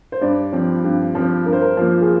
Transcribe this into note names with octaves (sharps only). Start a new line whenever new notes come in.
C5
G2 D5
F3 C4
G2
F3 C4
G2 A#4
C5
A#4
F3 A#3 F4
G#4